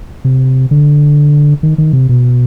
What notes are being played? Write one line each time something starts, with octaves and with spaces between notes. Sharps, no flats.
C3
D3
D#3
D#3
C3
B2